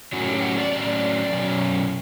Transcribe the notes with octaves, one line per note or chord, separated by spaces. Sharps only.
A2 F#3 C#4 F#4
G4
F#4
D5
A2 F#3 C#4 D5
B2 F#3 C#4